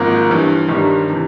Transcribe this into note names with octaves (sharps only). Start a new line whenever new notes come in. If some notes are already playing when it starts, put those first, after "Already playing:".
Already playing: G#1 G#2 F3 A#3
G1 G2 E3
G1 G2 D#3 G3
C3 E3